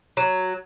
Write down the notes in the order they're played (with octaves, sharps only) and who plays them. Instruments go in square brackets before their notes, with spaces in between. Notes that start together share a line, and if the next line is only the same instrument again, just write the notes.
[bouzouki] F#3